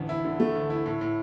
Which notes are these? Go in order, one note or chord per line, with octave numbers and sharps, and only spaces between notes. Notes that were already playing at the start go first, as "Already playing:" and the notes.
Already playing: A1 D2
E4
D3
A3
D2
E4
A2
A2